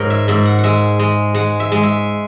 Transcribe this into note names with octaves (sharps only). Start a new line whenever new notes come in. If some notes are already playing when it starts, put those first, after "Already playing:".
Already playing: G#2 A#4 C#5
E5
G#2 E5
F#5
F#5
G#3 E5
G#3
G#3 F#5
E5
G#3
E5